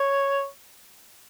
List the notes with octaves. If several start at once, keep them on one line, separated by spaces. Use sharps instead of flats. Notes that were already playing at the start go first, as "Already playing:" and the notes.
Already playing: C#5